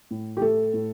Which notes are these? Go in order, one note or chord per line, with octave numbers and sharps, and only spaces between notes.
A2
G4
A3 A4
A2